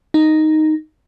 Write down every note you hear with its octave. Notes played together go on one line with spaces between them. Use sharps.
D#4